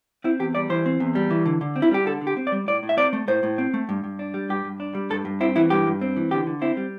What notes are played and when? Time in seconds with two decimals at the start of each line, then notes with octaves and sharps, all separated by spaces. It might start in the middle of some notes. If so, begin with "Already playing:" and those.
0.24 C4 E4
0.39 E2 G4
0.55 G3 D5
0.70 E3 C5
0.86 C4
1.00 E2
1.15 G3
1.31 E3
1.46 D3
1.61 D3
1.76 C4
1.82 E4
1.91 G3 G4
2.06 D3 A4
2.21 D3
2.27 G4
2.37 C4
2.47 D5
2.52 G3
2.68 A2 D5
2.83 A2
2.89 E5
2.97 C4 D5
3.13 A3
3.28 A2 C5
3.43 A2
3.58 C4
3.74 A3
3.89 G2
4.04 G2
4.19 D4
4.34 G3
4.49 G2 G4
4.64 G2
4.80 D4
4.95 G3
5.10 G2 A4
5.25 G2
5.41 C4 E4
5.56 E3 E4
5.70 G2 G4
5.87 G2
6.01 C4
6.16 E3
6.31 D3 G4
6.47 D3
6.62 C4 E4
6.77 G3